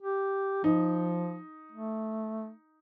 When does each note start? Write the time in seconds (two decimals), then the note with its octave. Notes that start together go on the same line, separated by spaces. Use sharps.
0.02 G4
0.64 F3 D#4
1.72 A3